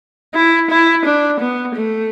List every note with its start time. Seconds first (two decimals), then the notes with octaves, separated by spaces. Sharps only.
0.35 E4
0.71 E4
1.06 D4
1.41 B3
1.76 A3